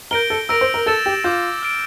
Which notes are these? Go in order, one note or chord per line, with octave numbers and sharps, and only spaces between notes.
A#4 G6 A#6 D7 G7
A4
A#4 E6 A#6 D7 F7
C5
A#4
A4 E6 A6 E7 G7
G4
F4 D6 G6 D7
F6 A6 D7